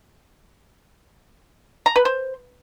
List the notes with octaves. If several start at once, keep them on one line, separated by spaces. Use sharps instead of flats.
A#5
B4
C5